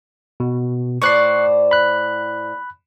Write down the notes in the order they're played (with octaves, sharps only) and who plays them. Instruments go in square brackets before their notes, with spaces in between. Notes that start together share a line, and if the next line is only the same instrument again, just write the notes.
[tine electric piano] B2
[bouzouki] A2 C5 D5 [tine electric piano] C#6 F#6 C7
[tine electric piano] B5 F#6